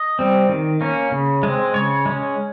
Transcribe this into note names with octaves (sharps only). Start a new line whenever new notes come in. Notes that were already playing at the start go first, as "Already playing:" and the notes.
Already playing: D#5
G3 C4
D#3
A#3 C#4
C#3
G#3 C4
C#3 C#5
G#3 C#4